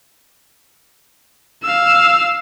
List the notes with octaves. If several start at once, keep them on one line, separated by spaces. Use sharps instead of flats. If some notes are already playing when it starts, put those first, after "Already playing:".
F5 E6